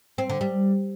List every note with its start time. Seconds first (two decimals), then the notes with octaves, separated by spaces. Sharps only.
0.18 C4
0.30 D3
0.41 G3